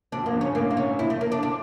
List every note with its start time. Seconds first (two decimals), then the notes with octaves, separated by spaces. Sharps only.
0.12 D2 D3 D4
0.22 A#1 A#2
0.26 A#3
0.34 C#2 C#3
0.41 G2 C#4
0.55 A2 A#3
0.71 A#3
0.77 C#4
0.99 A#1 A#2 E4
1.10 A3
1.21 A#3
1.32 D4
1.43 D4